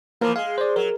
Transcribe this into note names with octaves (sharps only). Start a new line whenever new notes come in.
E3 F3 A#3 A#4
G#3 F5
C5 D5
F#3 A#4